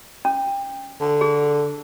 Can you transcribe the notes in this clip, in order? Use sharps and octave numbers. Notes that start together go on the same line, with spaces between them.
C#4
D3
G#4